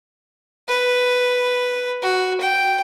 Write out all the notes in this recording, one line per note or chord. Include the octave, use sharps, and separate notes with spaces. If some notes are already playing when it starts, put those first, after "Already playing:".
B4
F#4
G5